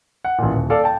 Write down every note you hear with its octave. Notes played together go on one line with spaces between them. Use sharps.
F#5
A1 A#2
D#1
A4 D5 F5
G5 A5